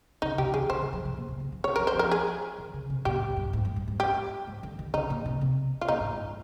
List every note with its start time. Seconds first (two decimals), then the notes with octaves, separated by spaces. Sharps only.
0.22 C#3 D#4
0.38 C3 G4
0.54 D#3 G#4
0.70 C#3 C5
0.81 D#3
0.93 F3
1.05 C3
1.17 A#2
1.28 C3
1.40 D#3
1.52 F3
1.64 D#3 C#5
1.76 A#4
1.80 F3
1.87 C5
1.95 F3 A#4
2.12 G#4
2.58 D#3
2.74 C#3
2.90 C3
3.05 A#2 G4
3.21 G#2
3.37 G2
3.53 G#2
3.65 G#2
3.76 G2
3.88 G#2
4.00 G4
4.47 G#2
4.63 D#3
4.79 D#3
4.94 C#3 D#4
5.10 A#2
5.26 C3
5.41 C3
5.81 F4
5.88 A#2 D#4
6.00 G#2
6.12 G#2